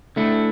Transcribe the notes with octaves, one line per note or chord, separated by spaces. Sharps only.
D3 A3 E4